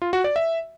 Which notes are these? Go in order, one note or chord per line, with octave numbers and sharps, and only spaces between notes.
F4
F#4
D5
E5